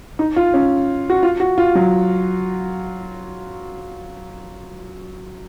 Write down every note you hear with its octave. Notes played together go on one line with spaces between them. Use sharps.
D#4
F4
C#4
F#4
F4
F#4
F4
F#3